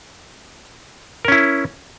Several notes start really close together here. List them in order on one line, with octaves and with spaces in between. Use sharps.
A#4 C#4 E4